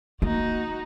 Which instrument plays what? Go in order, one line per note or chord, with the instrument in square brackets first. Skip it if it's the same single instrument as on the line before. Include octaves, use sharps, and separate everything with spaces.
[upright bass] A#3 [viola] D#4 F#4